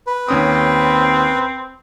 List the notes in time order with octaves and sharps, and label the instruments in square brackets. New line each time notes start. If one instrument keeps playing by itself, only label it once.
[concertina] B4
[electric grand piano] D#2 C#4 D#6 [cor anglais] C4